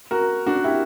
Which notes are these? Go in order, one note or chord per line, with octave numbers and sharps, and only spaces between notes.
F#4 A#4
D4 F#4
E4 G4